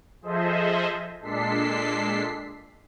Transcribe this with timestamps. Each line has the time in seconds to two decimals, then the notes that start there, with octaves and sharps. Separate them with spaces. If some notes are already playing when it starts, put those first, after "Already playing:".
0.22 F3 G#4 A4 C5 D#5 E5
1.20 A#2 G#3 D4 A4 B6 C7